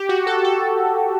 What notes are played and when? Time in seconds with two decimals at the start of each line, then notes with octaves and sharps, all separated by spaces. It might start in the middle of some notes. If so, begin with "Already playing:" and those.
Already playing: G4
0.09 F#4
0.27 A4
0.44 A4